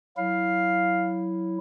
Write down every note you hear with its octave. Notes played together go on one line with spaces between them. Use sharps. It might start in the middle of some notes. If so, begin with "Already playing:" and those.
F#3 E4 F5